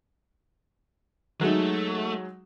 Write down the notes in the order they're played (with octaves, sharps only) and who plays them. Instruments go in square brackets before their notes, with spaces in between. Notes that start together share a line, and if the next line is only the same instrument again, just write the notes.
[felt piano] F#3 G#3 D#4 [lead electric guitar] A3